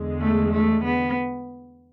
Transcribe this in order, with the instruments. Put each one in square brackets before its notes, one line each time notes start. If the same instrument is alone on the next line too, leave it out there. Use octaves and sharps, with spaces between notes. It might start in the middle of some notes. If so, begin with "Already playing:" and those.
Already playing: [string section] E2 D3 G#3
[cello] A3
A3
B3